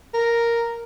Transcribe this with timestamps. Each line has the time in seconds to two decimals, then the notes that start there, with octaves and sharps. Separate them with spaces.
0.14 A#4